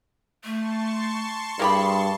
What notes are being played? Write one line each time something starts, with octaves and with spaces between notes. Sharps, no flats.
A3 A5 C6 C#6
G2 A#3 G4 G#4 B5